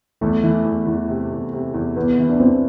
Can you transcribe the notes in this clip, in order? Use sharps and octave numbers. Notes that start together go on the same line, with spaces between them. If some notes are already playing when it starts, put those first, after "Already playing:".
E2 A3
E3
E2
E2
C3
E2
C3
E2
E2 B3
E3
D4
E2 C4